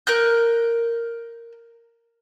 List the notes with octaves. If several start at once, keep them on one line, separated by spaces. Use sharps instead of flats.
A#4 F#6 G6